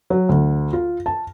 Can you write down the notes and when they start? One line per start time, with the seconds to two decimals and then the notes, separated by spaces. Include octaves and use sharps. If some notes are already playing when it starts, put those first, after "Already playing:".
0.10 F#3
0.29 D2
0.73 F4
1.06 A5